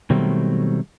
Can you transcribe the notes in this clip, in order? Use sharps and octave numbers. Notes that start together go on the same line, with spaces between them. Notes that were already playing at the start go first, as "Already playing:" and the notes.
B2 D#3 F#3 G3 A3 C4